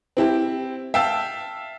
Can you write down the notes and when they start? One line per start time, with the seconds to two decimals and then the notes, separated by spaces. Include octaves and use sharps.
0.17 C4 E4 G4
0.94 E5 F5 G5 A5 E6